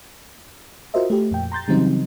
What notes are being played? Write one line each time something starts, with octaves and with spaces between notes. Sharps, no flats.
F4 F#4 A#4 C5 D#5 E5
A3 G4
F2 A#2 G5
A#5 C6 G6 A6
C#3 E3 F#3 G3 C4 D#4